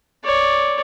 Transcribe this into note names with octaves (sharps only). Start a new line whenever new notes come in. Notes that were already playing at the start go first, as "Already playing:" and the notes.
C#5 D5